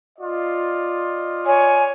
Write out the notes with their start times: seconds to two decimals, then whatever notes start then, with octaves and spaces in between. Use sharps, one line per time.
0.19 F4 D5 D#5
1.46 C#5 G#5